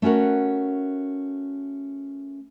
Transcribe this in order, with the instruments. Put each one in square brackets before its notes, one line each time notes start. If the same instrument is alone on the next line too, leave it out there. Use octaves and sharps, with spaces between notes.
[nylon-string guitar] A3 C#4 F#4 A#4 F#5